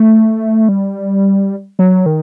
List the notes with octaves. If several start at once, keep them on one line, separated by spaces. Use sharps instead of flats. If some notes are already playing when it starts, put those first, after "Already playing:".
Already playing: A3
G3
F#3
D#3